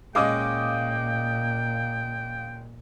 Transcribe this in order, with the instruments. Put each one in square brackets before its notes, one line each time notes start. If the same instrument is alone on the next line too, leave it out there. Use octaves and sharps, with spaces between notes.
[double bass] A#2 [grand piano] G#3 C#4 D#5 [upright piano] F5 D6 D#6 [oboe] G5